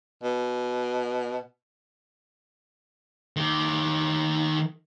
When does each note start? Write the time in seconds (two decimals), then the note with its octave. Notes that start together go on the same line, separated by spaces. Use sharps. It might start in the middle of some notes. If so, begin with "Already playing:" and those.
0.23 B2
3.37 D#3 G4